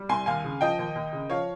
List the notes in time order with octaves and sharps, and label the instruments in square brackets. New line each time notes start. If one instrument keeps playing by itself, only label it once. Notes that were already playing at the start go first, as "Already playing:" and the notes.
Already playing: [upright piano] G3
C2 G#5 C6
D#2 F5 G#5
C#3
F3 D#5 G5
D#2
D#2
C#3
F3 C#5 F5